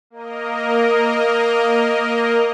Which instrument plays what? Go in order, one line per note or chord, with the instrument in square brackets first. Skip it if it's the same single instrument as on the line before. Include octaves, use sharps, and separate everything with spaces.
[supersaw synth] A#3 A#4 D#5